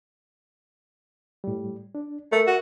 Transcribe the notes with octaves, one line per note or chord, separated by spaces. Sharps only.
A2 G3
D4
A3 A#4 E5
F#4